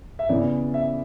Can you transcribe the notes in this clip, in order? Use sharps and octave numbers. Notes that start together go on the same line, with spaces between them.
E5
C#3 E3 B3 D5
E5